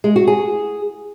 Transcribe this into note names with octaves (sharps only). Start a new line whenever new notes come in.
G#3
F#4
G#4